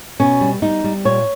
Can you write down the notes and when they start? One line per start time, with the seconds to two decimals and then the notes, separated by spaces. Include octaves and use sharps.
0.20 B2 C#4
0.41 G3
0.62 G3 D#4
0.84 G3
1.05 A#2 C#5